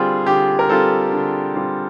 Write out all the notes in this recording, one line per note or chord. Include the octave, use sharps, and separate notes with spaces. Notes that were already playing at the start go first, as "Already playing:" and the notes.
Already playing: D3 G3 C4 F4 G#4
D3 G4
A#4
G3 C4 F4 A4
D3
G3 C4 F4